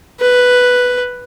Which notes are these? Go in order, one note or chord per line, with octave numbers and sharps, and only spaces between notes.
B4